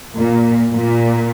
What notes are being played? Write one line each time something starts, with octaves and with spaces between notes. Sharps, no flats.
A#2
A#2